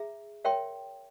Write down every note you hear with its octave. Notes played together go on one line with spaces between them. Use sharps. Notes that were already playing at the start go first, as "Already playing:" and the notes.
Already playing: G#4 E5 A#5
A#4 C#5 E5 G5 C6